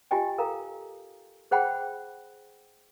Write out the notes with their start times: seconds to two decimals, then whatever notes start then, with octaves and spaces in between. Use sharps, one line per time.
0.11 F4 G4 D#5 G5 G#5
0.38 A4 A#4 F5 A#5
1.51 G#4 C5 F#5 G5 B5